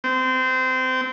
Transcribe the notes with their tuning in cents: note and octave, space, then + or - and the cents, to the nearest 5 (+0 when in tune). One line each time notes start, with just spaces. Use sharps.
C4 -25